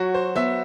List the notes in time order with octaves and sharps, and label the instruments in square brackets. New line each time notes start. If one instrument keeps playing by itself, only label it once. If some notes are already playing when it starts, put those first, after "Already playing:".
Already playing: [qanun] F#3 [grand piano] F#4
[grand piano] C5
[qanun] B3 [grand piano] E5